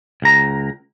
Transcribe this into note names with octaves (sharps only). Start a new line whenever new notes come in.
C#2 A#5